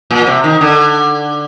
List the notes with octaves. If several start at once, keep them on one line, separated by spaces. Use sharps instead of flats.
A#2
C3
D#3
D3